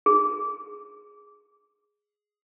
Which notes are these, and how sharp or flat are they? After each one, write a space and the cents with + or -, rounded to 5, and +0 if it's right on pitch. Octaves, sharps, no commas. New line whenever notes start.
G#4 +5